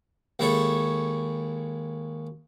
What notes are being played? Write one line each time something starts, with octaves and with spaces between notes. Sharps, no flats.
D#2 G#3 E4 A4 C#5